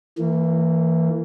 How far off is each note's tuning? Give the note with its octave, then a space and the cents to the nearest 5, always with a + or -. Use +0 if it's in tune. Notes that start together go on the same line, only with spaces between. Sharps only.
E3 +0 A#3 -30